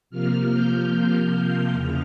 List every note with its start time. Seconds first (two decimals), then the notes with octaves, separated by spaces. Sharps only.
0.10 C3 F3 A#3 F6
0.51 G6
0.91 G6
1.32 F6
1.72 E2 C#3 F3